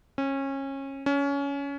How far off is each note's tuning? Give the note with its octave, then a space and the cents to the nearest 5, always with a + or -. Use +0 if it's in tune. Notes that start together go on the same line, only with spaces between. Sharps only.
C#4 -25
C#4 +20